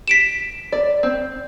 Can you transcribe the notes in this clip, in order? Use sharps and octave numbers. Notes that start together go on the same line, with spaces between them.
B6 D7 E7
D5
C4